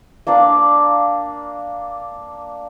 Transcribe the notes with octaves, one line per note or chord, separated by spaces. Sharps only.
A#3 D4 D5 F5